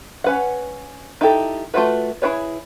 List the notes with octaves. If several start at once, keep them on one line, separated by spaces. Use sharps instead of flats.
C#4 B4 F#5
D#4 E4 F#4 G4 A4
A3 A#3 F4 F#4 B4
E4 F4 G#4 B4 C#5